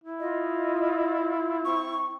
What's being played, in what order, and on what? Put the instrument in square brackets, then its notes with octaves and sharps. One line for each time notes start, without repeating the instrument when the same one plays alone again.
[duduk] E4
[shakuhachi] F4 [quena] D#5
[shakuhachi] C4 [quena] C#6